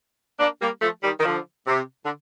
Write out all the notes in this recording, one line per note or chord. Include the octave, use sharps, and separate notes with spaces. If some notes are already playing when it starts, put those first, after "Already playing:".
A#3 D4
G3 A#3
F3 A3
D#3 G3
D#3
D3 F3
C3
D3